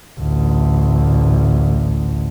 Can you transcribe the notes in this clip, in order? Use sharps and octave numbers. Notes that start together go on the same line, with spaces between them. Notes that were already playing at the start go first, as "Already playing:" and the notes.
A1 D2